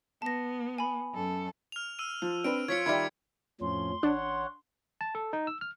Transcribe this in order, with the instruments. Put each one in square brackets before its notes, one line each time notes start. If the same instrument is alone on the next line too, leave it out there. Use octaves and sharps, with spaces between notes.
[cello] B3 [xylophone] A5 A#6
[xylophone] G#5 B5
[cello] F#2 A4
[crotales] F6 F7
E6 D#7
[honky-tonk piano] F3
[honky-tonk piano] C4 D4 B4 [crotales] D7
[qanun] F3 F4 [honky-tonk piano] C#5 [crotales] G#6 B6 C#7
[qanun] D#3 G3 [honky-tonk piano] D5 E5 B5 [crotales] G#6
[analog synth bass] F2 [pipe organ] A2 F3 C#4 [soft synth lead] C6
[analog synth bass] A1 [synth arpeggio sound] D4 [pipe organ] C#5 F#5
[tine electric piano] A5
A4
D#4
E6
F6